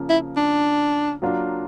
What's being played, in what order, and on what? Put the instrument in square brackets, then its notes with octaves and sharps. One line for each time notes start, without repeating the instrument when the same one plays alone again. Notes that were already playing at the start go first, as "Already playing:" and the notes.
Already playing: [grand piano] C#3 F3 A#3
[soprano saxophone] E4
D4
[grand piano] F#3 A#3 D4 F4